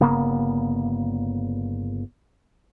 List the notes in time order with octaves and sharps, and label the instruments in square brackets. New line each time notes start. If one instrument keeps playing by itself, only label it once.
[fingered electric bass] G1 C#3 A#3 B3